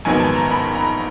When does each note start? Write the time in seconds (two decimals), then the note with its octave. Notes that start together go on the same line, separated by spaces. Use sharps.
0.05 A#1 G#2 D#3 F#3 B3 G#5
0.20 A5
0.36 A#5
0.51 B5
0.75 A#5